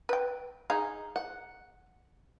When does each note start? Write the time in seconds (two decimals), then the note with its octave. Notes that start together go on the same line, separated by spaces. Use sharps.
0.09 B4 G5
0.70 D#4 G#4 F5
1.16 F#5